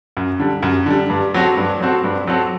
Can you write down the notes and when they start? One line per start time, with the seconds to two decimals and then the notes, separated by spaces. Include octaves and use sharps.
0.17 F#2
0.40 D3 G3
0.62 F#2
0.86 D3 G3
1.10 G2
1.34 F#3 C4 F#4 A4
1.57 G2
1.80 F#3 C4 F#4 A4
2.04 G2
2.27 F#3 C4 F#4 A4